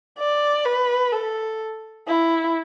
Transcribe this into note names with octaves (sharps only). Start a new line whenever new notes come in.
D5
B4
A4
E4